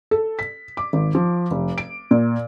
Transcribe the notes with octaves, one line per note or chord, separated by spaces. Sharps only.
A4
B6
D6
G#1
F3
F1
D7
A#2